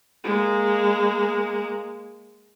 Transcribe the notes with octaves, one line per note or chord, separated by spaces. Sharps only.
G#3 A#3